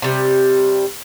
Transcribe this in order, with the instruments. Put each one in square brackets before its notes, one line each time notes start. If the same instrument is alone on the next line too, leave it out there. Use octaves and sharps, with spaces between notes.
[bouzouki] C3 G3